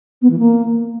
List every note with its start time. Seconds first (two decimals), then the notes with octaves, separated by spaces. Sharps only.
0.22 B3
0.30 E3
0.39 A#3